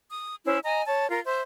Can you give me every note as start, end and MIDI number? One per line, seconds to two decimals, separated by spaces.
0.11 0.35 87
0.45 0.59 61
0.45 0.59 64
0.45 0.59 72
0.64 0.83 75
0.64 0.83 80
0.64 0.83 82
0.87 1.09 73
0.87 1.09 81
1.09 1.20 65
1.09 1.20 70
1.25 1.40 72
1.25 1.40 76